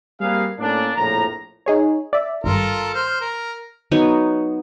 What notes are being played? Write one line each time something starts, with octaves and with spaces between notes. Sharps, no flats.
G3 A#3 C4 G#4 B4 F5
A2 A#3 C#4 D4
A#1 F2 A2 A#5
D#4 G#4 C#5
D5 E5
G#1 G2 F4 A4 A#4
C5 F6
A#4
F#3 B3 D#4 C#5